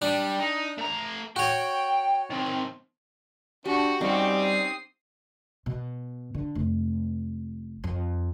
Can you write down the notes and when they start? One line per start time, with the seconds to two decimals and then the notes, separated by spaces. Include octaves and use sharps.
0.02 G3 D4
0.39 D#4
0.78 A3 A#5
1.36 F#4 C#5 G5
2.30 D#3 C4
3.65 D4 F#4 G4
4.01 G3 C4 C#4 D#4 G4 F5
4.37 D#6 C7
5.66 B2
6.34 D3
6.55 F1
7.84 F2